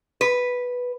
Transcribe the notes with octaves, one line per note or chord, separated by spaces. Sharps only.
B4